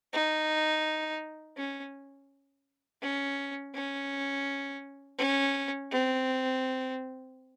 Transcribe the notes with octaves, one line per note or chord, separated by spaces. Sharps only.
D#4
C#4
C#4
C#4
C#4
C4